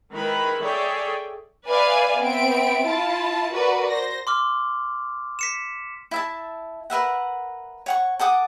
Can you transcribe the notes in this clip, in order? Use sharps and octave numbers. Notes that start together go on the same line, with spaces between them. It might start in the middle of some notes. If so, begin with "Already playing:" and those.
D#3 G#3 E4 A#4 B4 B5
G#4 A4 C#5 D5 E5 G5
B4 D5 E5 F5 G#5
B3 C4 E5 D7
E4 F4 A5
F#4 A#4 B4 D5
C5 A#6
C6 D6 F6
B6 C#7 E7
E4 E5 A5
A#4 B4 E5 F#5
C#5 F#5 C#6
A4 F#5 D6 D#6